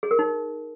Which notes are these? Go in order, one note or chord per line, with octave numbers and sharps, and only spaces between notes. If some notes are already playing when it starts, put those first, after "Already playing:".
G#4
A#4
D#4